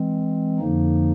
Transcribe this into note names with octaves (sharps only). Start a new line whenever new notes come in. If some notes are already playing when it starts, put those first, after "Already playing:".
Already playing: E3 G#3 C4
F2 D3 F3 A#3 D#4